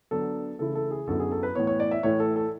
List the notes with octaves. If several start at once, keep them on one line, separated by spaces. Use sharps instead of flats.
D3 F#3 B3 D4 A4
C#3 E3 A3 E4 A4
A4
G#4
F#2 D3 F#3 B3 E4 A4
G#4
A4
B4
A2 E3 B3 C#5
C#5
D5
E5
A2 E3 A3 C#5
A4
A4